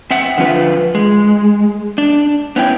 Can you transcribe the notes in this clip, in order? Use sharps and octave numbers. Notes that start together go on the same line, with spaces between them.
C4 E5 F#5
D3 F3 F4 B4
G#3
D4
B3 C#4 E4 G5